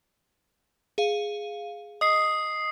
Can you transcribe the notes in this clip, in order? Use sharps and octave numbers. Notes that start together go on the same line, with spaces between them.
G#4 F5
D#5 D#6 C7